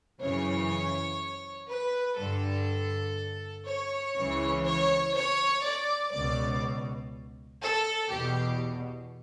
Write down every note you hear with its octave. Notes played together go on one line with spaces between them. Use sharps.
F#2 C#3 E3 C#5
B4
G2 D3 A4
C#5
C#2 C#3 E3
C#5
C#5
D5
C#2 B2 D5
A4
E2 B2 G4